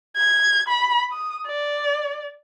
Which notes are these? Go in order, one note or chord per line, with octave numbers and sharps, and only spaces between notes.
G#6
B5
D#6
D5